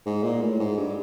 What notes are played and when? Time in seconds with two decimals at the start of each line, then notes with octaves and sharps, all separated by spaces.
0.06 G#2
0.23 A#2
0.41 A2
0.59 G#2
0.77 G2